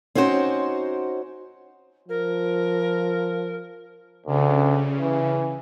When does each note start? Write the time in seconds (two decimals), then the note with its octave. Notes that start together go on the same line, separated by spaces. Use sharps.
0.15 C4 C#4 D#4 F#4 C5
2.09 F3 A#4
4.27 D2 C#3
4.99 E3